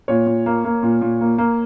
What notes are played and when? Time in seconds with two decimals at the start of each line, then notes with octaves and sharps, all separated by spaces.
0.08 A#2 C#5
0.26 A#2
0.46 A#3
0.65 A#3
0.83 A#2
1.01 A#2
1.21 A#3
1.38 A#3